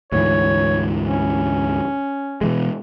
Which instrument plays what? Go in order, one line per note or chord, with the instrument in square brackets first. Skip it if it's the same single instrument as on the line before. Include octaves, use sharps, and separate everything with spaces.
[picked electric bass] D2 G#2 E3 [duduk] C#5
[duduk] C#4
[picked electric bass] B2 E3 G#3